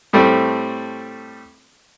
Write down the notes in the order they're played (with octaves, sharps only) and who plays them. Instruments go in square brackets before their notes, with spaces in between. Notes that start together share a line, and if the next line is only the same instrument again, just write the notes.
[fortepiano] A2 G3 A3 C4